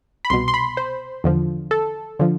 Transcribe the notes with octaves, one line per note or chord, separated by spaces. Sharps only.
B5
C2 B2 C6
C6
B5
C5
E2 D3 F3
A4
D3 F3